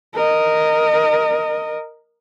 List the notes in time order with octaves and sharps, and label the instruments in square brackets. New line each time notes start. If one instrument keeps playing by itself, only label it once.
[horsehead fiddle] A#4 D#5